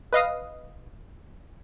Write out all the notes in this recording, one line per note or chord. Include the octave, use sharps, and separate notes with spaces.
B4 D#5 F5 D#6